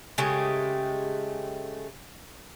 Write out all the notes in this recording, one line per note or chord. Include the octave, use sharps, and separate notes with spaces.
C#3 G#3 A3 G4